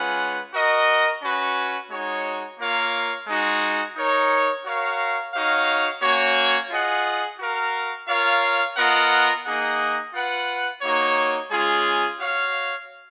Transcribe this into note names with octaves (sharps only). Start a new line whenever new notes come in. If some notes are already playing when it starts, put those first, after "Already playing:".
Already playing: G#3 C#4 F4 B4 F#5
F#4 A#4 D#5
C#4 F#4 B4
G#3 D#4 F#4 C#5
A#3 F4 A#4 C#5 F5
G#3 D#4 F#4
D#4 A#4 C#5
F#4 A#4 C#5 F5
D#4 F#4 C#5 F5
A#3 C#4 F#4 C#5
F4 G#4 D#5 F#5
F#4 A#4 F5
F4 A#4 C#5 F5
B3 F4 A#4 D#5 F#5
A#3 D#4 G#4 D#5 F#5
F4 B4 F#5
A#3 D#4 F#4 C#5
G#3 C#4 F4 G#4
F#4 C#5 F5